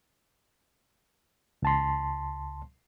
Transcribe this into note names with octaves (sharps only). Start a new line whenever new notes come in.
C#2 A5 C6